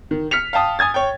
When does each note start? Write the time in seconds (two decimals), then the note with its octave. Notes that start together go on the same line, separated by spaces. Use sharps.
0.11 D#3
0.31 F6 B6 C#7 F7
0.53 F5 G5 A5 D#6
0.79 G#5 D#6 G#6 A6
0.94 C#5 G5